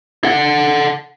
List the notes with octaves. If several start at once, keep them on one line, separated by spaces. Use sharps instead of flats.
A4 F#5